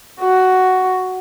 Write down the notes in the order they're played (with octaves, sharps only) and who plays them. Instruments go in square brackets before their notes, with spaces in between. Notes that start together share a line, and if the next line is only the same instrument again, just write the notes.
[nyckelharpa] F#4